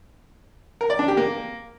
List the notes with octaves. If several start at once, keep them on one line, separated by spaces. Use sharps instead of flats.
A#4
D5
D4
G4
A#3